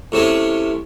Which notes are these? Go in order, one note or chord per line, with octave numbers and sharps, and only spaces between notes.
A2 C3 C4 C#4